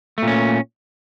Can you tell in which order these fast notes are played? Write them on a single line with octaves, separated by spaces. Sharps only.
A3 A#2 C#4